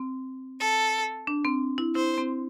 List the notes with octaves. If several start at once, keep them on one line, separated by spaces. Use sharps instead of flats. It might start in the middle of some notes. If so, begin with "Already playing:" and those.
Already playing: C4
A4
D4
C4
E4
E4 C5
C4